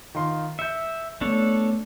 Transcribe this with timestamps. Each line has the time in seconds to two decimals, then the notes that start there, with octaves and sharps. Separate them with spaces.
0.15 D#3 F4 C6
0.59 E5 G6 C#7
1.21 A3 B3 D4 A4 C#5